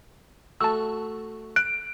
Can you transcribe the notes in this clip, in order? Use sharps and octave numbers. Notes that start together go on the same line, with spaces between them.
A3 F#4 A4 A5 E6
F#6 D7